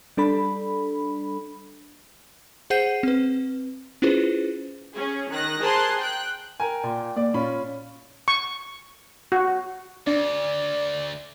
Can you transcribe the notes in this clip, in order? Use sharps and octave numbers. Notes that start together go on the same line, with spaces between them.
G3 D4 A4 B5
G#4 C5 F#5 G6 C7 D#7
C4 B4
C#4 E4 F4 G#4 B4 C5
C#4 G#4
D#3 F#6 A#6
G#4 A#4 C5 A5 C6 F#6
G5 F#6
A#4 G5 G#5
A#2
A#3 D5
A#2 C#4 F4 B5
C#6
F#4
D2 D4 D5